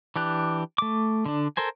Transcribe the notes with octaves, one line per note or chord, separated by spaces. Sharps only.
E3 D4 G4 F#6
A3 D6
D3 D4
A4 A#4 C5 G#5